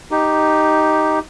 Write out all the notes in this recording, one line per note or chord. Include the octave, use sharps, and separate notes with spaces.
D#4 G4